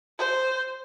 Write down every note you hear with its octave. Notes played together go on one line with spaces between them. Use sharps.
C5